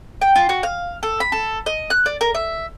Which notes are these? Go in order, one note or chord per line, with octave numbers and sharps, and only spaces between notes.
G5
F4
F#4
F5
A4
B5
A4
D#5
F#6
D5
A#4
E5